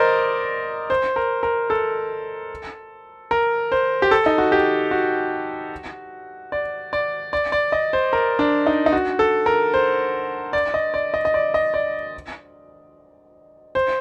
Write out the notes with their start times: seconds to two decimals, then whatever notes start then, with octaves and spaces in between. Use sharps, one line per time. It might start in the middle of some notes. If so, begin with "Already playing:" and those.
Already playing: A#4 C5 D5 D#5
0.90 C5
1.16 A#4
1.43 A#4
1.70 A4
3.31 A#4
3.72 C5
4.02 G4
4.11 A4
4.26 D#4
4.38 F#4
4.52 G4
4.91 F#4
6.52 D5
6.93 D5
7.33 D5
7.52 D5
7.72 D#5
7.93 C5
8.13 A#4
8.39 D4
8.66 D#4
8.86 D#4
8.92 F#4
9.19 A4
9.46 A#4
9.74 C5
10.53 D5
10.74 D#5
10.94 D5
11.14 D#5
11.25 D#5
11.34 D5
11.54 D#5
11.74 D5
13.75 C5